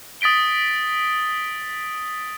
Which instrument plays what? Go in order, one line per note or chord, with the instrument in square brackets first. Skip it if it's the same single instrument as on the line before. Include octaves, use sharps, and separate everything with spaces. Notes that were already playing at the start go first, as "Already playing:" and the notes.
[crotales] D#6 A6 B6 D7 G7